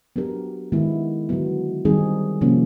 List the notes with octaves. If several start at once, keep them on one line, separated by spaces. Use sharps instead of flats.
F#3 B3 D4 G4 A#4
D#3 G#3 B3 E4
D3 F#3 B3
D#3 G3 C4 D#4 G#4
C3 F3 A#3 C#4